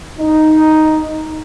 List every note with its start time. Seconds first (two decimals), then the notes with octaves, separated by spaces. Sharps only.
0.19 D#4